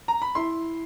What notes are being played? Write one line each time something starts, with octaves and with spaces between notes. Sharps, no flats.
A#5
B5
E4 C6